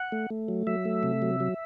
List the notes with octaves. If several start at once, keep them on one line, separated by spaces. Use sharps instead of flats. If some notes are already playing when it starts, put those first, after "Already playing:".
Already playing: F#5
A3
A3
F#3
F#3 E5
A3
C3
F#3
F#3